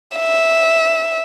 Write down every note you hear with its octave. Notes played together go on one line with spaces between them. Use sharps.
E5